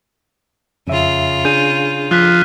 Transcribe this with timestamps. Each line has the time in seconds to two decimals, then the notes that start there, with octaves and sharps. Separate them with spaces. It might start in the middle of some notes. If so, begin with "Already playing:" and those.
0.87 F2 C#3 F4 E5
1.45 D4 G#4 G6 D#7
2.11 F3 F6 F#6 B6